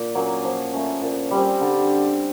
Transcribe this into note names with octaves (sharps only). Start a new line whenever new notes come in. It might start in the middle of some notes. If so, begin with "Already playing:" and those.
Already playing: A#2
F#3 A#3 C#4
F3
A3 C#4
A#2
G3 C4
D3